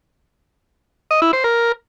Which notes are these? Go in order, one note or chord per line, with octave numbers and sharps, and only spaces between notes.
D#5
E4
C5
A#4